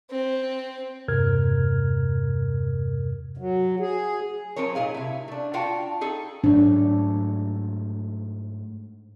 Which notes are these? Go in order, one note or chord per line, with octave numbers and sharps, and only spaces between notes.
C4
E2 G2 C3 A#4 F6 G#6
F#3
G#4
F3 F#3 C4 A#4 C#5
A#2 D#4 G#4 F5
C3 E4
A3 D4
D4 F4 F#4 F5 G5 A5
D#4 G#4 A4
G#2 F#3 A3 D4